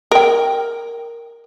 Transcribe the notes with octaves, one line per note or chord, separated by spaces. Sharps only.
A#4 G5